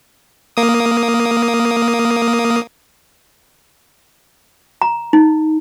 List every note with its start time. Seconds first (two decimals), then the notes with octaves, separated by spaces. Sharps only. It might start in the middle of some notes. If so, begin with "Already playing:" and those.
0.57 A#3 D#6
4.82 A#5
5.13 D#4